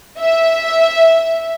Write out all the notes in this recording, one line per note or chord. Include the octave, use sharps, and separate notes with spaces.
E5